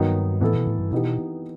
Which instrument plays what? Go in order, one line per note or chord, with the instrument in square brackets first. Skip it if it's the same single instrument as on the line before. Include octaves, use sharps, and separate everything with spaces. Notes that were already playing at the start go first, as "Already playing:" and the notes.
Already playing: [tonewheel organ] G2 [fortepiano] D#3 F#3 B3 D#4
[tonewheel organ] A2 [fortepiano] E3 B3 E4 A4
[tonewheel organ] B2
A2
G2
[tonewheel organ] B2 [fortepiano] E3 B3 D#4 G4